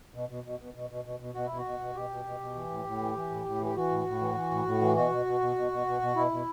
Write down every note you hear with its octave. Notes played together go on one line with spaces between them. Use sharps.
B2
B2
B2
B2
B2
B2
B2
B2
B2 F#4
B2 E4
F#4
B2
B2
B2 G4
B2
B2
B2
E3
A2
A2
E3
E3
A2
A2
E3 G4
E3 F#4
A2
A2
E3
E3
A2
A2
E3
B2 F#4
B2
B2
B2
B2
B2
B2
B2
B2 E4
B2